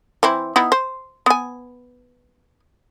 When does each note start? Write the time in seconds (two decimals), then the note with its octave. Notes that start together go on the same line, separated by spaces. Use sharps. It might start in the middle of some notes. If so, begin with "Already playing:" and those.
0.23 E3 C4 E4
0.56 B3 D#4 E4
0.72 C5
1.26 B3 G#5